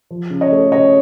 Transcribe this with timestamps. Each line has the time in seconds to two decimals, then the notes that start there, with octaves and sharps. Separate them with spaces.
0.11 F3
0.30 C#3
0.41 C#5 D#5
0.52 A3
0.72 C#3 C#5 D#5